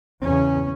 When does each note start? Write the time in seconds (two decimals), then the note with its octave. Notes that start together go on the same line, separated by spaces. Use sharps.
0.22 E2 C#3 C#4